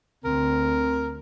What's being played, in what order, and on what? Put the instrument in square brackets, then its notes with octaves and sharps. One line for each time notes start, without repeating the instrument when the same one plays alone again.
[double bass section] D2 [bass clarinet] C4 [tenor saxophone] A#4